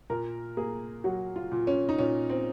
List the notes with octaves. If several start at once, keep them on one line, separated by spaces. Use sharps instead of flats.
A#2 A#4
A#3 G#4
F#3 F#4
F4
A#2
C#4
D#4
A#2 C#4
C4